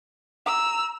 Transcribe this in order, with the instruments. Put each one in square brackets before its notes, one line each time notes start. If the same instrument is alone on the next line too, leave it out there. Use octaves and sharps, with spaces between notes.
[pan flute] A#5 [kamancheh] E6